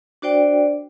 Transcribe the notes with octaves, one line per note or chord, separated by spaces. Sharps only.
D4 F#4 C5 D5 G5